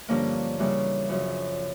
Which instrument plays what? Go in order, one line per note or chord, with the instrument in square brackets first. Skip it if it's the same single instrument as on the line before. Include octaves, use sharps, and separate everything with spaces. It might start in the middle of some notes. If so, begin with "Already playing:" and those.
[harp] G2 D3 F3 A#3 C#4
C#3 E3 G3 A#3
F#2 C#3 F3